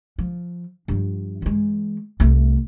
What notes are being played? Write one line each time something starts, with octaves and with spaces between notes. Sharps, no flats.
F3
G2 F3
E3 G#3
C2 A3